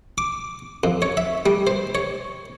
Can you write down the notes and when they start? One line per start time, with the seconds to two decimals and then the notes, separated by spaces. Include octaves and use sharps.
0.18 D6
0.84 F2
1.02 C#5
1.17 E5
1.46 G3
1.67 C5
1.95 C#5